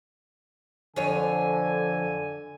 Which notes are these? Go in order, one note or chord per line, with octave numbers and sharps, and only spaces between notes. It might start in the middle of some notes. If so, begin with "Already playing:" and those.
F2 D3 C#5 G#5